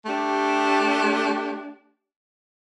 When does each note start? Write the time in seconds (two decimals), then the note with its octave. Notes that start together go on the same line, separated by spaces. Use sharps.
0.06 A3 D4 G4